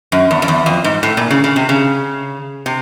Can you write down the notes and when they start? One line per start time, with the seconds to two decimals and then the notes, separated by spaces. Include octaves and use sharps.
0.12 F#2
0.31 E2
0.42 F2
0.48 E2
0.66 F2
0.84 G#2
1.03 A2
1.17 A#2
1.31 C#3
1.44 C#3
1.56 C3
1.69 C#3
2.66 C3